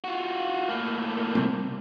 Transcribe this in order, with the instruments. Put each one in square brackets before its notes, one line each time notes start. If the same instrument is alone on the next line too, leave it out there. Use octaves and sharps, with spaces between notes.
[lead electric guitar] F4 F#4
A2 A#3
[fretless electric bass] C3 G3 C4